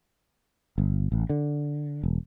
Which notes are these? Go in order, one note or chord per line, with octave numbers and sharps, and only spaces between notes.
G1
A1
D3
E1